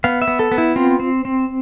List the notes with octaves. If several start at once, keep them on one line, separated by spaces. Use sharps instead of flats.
B3 F5
E5
B3
A4
B3
E4
C4 F4
C4
C4